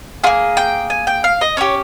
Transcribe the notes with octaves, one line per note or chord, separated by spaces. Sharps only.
A#3 F4 G#4
G5
G#5
G5
F5
D#5
C#4 G4 C#5